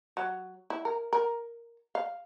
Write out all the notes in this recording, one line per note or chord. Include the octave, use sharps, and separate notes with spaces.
F#3
E4
A#4
A#4
F5